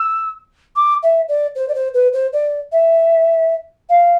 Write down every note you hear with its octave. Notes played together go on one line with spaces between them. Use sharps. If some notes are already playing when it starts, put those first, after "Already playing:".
Already playing: E6
D6
E5
D5
C5
D5
C5
B4
C5
D5
E5
F5